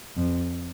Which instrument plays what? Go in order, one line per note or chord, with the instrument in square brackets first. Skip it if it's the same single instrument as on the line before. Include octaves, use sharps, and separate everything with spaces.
[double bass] F2